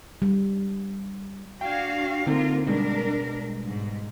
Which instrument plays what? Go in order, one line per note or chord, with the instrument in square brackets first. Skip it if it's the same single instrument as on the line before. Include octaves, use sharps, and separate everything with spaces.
[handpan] G3
[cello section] D4 F#4 F5 [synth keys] G5 G#6
[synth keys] D3 C4 D#4 [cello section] A#3 F4 A#4
[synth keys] B2 G3 G#3 [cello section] D4 A#4
[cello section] G#2